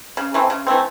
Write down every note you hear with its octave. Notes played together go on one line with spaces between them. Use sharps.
C#3
E3 A3 C4
C#3
E3 A3 C4